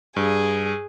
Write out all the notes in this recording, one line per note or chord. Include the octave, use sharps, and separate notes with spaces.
G2 G#4